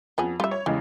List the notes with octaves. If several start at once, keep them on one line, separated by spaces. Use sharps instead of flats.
F2 B3 C#4 G#4
G3 F4 E5
C#5
E2 C#3 G3 G#3